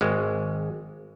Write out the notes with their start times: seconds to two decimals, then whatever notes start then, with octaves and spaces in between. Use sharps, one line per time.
0.01 G#1 G#3